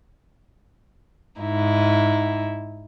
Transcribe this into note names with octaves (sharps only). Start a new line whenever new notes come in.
G#2 D#4 E4